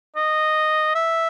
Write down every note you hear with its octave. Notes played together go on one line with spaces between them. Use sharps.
D#5
E5